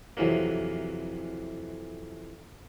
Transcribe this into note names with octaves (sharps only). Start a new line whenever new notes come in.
F2 C3 E3 F#3 A#3